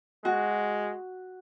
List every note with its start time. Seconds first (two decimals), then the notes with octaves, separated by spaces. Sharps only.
0.25 G#3 F#4